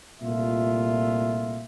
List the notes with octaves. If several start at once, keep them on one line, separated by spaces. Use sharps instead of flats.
C2 A#2 A3 F4 E5